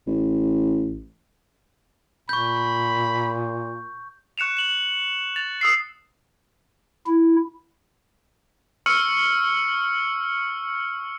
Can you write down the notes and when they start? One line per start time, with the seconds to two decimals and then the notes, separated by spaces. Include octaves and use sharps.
0.07 A1
2.29 A#2 B5 C#6 G6
4.38 C#6 F#6 C#7 E7 F7
4.57 E7 F#7
5.36 A6 F7
5.61 D#6 E6 C7
7.07 E4
8.86 C#6 E6 F6 C#7 F#7